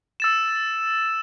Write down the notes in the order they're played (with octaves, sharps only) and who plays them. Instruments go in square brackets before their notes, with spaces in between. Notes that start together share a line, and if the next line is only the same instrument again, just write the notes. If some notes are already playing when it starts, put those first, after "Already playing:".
[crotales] E6 A6 E7